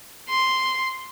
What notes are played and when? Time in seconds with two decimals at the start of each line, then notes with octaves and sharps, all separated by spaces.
0.29 C6